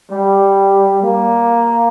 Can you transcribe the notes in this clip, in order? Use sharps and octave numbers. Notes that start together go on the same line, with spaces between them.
G3
A#3